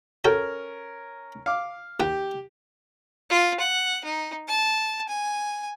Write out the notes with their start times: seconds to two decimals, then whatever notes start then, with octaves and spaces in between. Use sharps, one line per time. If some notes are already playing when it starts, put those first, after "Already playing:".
0.24 C#4 F#4 A4 A#4 G5
1.46 F5 D6
2.00 D#2 G4 F#5 G5
3.30 F4
3.60 F#5
4.04 D#4
4.48 A5
5.08 G#5